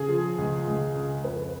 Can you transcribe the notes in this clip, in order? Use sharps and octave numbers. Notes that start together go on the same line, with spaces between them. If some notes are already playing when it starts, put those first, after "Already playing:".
Already playing: C#3 G#4
F3
C#2
C#2
C#3
F2 B4